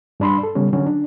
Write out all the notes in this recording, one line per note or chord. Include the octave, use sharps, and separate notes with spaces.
G2 D4 B5 C6
A4
C#3 G3 B3 C#4
D3 F#3 C#4 F#4
D4